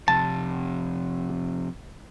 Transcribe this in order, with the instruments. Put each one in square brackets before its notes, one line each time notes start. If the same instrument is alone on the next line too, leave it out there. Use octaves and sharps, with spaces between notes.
[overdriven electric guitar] F2 C3 [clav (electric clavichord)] A5